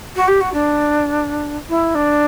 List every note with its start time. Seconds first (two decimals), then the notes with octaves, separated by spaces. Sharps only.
0.16 F#4
0.28 G4
0.40 F#4
0.53 D4
1.69 E4
1.95 D4